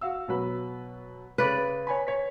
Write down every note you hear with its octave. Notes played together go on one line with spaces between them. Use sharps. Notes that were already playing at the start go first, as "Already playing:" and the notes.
F#4 F5 E6
B2 F#3 B4
C#3 B4 D5
C#5 G#5 B5
C#5 B6